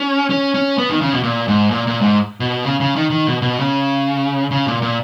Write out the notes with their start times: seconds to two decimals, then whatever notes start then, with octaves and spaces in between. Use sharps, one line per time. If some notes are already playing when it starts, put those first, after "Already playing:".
Already playing: C#4
0.30 C#4
0.54 C#4
0.78 B3
0.89 D#3
1.01 C#3
1.13 B2
1.23 A#2
1.48 G#2
1.71 A#2
1.87 A#2
2.01 G#2
2.40 B2
2.65 C#3
2.80 C#3
2.96 D#3
3.10 D#3
3.27 B2
3.42 B2
3.58 C#3
4.51 C#3
4.66 A#2
4.82 A#2